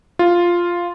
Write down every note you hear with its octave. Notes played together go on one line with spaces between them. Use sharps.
F4